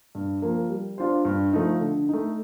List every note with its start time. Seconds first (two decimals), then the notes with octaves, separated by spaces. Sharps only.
0.15 G2
0.42 F3 A#3
0.70 G3
0.98 D4 F4 C5
1.25 G2
1.53 F3 A3 D#4
1.81 D3
2.09 A3 D#4